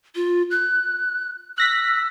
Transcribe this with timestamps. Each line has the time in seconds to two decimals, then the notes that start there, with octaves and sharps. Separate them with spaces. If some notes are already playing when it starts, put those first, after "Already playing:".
0.16 F4
0.51 F#6
1.58 E6 F#6 A#6 B6